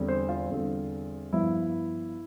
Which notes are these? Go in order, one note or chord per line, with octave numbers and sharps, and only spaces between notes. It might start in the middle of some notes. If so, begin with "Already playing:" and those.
Already playing: E2 D3 G3 C4
C5
F4
E2 D3 G3 C4
G2 F3 B3 E4